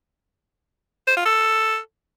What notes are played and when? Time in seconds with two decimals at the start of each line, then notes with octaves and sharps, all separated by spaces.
1.07 C5
1.17 F4
1.26 A4